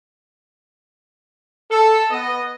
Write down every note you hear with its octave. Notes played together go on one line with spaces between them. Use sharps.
A4
B3 D#5